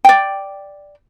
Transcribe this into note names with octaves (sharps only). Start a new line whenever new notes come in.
D5 G5